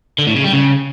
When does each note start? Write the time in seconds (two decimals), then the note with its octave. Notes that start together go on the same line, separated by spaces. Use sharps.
0.19 D3
0.27 A2
0.36 C#3
0.45 G3
0.53 C#3